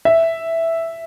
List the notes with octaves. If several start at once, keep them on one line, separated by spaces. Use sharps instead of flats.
E5